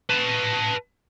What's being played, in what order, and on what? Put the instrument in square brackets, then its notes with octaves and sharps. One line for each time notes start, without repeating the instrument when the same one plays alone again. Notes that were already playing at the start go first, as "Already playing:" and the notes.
[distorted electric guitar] B4 A5